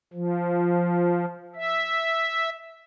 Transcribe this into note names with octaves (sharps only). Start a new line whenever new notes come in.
F3
E5